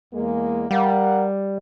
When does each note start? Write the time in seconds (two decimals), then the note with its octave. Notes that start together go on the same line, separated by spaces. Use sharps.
0.14 E2 G#3 A#3
0.71 G3 A#4 F5 F#5